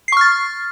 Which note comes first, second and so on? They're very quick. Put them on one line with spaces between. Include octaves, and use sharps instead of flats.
C7 C#6 F6 A6